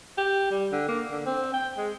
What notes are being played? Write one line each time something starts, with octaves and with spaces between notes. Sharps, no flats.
G4
G3
D3
A#3
D3
C4
G5
G#3